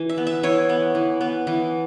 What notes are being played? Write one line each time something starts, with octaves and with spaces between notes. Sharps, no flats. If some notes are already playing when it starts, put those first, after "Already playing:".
Already playing: E3
E5
B3
E5
E3 C#5
B3
E3
B3
E3